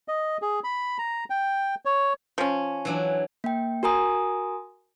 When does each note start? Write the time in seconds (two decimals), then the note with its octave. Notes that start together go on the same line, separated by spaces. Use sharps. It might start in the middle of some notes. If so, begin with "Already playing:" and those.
0.08 D#5
0.42 G#4
0.64 B5
0.98 A#5
1.30 G5
1.85 C#5
2.38 F3 C#4
2.85 E3 F#3 D4
3.44 A#3 G5
3.83 F#4 A#4 G#5 A#5 D#6